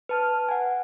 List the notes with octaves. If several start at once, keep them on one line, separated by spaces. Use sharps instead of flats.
B4 A5 F6
F#5 G#5